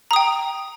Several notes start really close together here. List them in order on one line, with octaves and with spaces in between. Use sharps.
A#5 D#6 G5